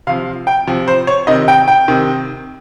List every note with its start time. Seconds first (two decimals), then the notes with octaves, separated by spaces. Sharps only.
0.07 C3 F3 F5
0.47 G5
0.67 C3 F3
0.88 C5
1.07 C#5
1.27 C3 D#3 D#5
1.48 G5
1.68 G5
1.88 C3 D#3